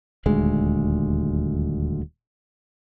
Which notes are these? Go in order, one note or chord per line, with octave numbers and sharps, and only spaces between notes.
D#1 D2 G#3